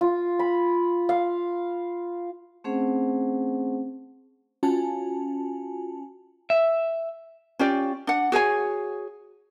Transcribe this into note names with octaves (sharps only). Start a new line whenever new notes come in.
F4
B5
F5
A3 C4 C#4 G#4 C5 F#5
C#4 F4 F#4 G#5 A5
E5
C#4 F4 G4 D5
D4 F#5
F#4 G#4 C#5 G#5